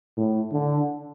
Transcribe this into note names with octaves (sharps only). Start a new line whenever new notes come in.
A2
D3